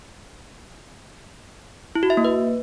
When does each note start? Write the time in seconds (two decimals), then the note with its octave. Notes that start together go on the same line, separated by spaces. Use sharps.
1.95 E4
2.03 F#4
2.10 E5
2.17 A#3
2.25 B4